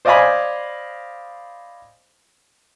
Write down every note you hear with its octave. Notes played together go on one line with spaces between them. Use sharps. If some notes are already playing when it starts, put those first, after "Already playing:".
C5 D5 D#5 F5 G#5 B5